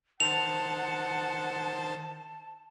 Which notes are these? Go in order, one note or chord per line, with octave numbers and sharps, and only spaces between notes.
D#3 C5 F#5 A5 A6 F7